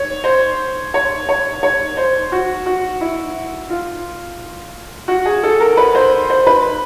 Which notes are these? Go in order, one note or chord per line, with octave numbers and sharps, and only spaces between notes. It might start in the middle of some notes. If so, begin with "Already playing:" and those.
Already playing: C#5
C5
C#5
C#5
C#5
C5
F#4
F#4
E4
F4
F#4
G#4
A4
A#4
B4
C5
C5
B4